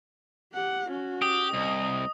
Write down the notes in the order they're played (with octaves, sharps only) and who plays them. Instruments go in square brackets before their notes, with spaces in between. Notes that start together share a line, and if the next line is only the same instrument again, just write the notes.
[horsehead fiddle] G4 F#5
C#4 F#4
[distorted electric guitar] G4 [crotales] D#6
[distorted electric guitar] C2 [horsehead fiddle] D#5